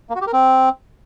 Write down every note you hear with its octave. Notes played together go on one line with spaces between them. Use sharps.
A#3
F#4
G4
A#4
C4